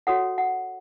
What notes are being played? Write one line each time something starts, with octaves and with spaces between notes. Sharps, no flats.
F#4 A4 C#5 F#5
F#5